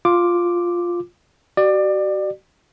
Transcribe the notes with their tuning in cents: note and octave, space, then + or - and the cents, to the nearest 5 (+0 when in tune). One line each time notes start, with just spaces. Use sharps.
F4 +0 D6 +0
F#4 +40 D5 +25